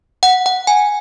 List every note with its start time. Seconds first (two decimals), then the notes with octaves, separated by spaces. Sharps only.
0.23 F#5
0.46 F#5
0.67 G#5